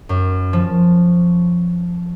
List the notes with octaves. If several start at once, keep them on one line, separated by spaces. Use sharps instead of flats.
F#2
F3